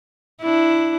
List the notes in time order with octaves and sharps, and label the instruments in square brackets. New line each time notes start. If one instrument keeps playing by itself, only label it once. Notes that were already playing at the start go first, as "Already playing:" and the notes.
[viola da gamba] D4 E4